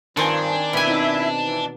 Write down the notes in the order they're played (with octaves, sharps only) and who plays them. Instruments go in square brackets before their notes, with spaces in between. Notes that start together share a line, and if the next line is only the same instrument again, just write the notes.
[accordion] G2 F3 [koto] D#3 C4 [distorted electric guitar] D4 [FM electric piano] G#5 A5
[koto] B2 G#5 [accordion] E4 E5
[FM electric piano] C4 D#4
[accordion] E3